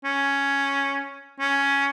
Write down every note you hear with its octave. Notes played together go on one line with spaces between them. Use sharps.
C#4
C#4